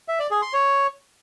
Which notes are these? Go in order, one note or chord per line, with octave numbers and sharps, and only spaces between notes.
E5
D5
G#4
C6
C#5